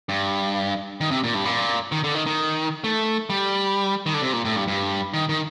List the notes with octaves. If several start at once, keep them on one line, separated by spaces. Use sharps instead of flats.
G2
D#3
C3
A#2
G2
A#2
D#3
D3
D#3
D#3
A3
G3
D#3
D3
C3
A#2
A2
G2
G2
D#3
D#3